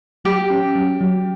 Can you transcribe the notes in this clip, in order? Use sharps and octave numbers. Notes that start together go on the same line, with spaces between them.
F#3 G4
C#4
F#3
F#3